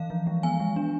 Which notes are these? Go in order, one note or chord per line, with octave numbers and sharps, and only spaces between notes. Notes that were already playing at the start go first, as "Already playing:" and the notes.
Already playing: E3 F5
F3
G#3
B3 G#5
G#3
D4